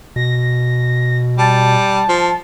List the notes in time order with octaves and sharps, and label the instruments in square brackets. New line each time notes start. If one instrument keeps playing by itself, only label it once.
[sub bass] B2 [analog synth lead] A#6
[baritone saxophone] G3 [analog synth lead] A5
[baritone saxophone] F3